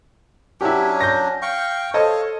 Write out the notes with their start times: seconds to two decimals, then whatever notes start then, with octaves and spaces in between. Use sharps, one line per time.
0.61 F#3 C#4 D4 E4 G4
1.00 G6 A#6
1.42 F5 G5 C#6
1.94 A4 C5 C#5 D#5 F5